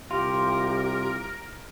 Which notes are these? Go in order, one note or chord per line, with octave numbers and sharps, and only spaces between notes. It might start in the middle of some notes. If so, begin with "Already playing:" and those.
C2 F4 G4 A#4